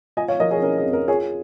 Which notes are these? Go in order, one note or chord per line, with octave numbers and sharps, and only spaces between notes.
F4 D#5 G#5
C#5 F5
F3 A#4 D#5
G#4 C#5
C#4 A#4
G#4
F2
A#4
F4 G#4 C#5